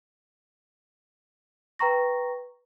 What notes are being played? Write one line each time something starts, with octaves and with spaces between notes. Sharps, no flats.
B4 G5 A#5 C#6 A#6